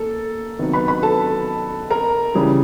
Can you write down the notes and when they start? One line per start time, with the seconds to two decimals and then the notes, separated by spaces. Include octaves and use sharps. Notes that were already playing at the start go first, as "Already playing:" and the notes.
Already playing: A#3 A4
0.59 C3 D#3 F#3 B3
0.73 B4 B5
0.88 B4 B5
1.03 A4 A5
1.90 A#4 A#5
2.35 C#3 E3 G3